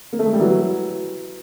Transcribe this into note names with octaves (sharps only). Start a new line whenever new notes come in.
A#3
A3
G#3
G3
E3 F#3